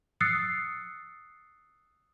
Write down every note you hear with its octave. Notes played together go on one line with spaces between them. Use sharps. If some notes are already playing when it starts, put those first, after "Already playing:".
D#6 E6 F#6 A6 C7 C#7